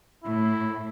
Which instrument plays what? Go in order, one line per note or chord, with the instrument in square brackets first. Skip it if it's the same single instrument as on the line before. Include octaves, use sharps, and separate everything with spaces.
[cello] A2 [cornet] E4